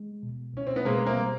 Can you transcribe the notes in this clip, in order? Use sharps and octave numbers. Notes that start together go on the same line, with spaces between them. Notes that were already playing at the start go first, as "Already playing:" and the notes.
Already playing: G#3
B2
C2 C#4
C4
B3
B2 G#3 A#3
A#3 C4
G3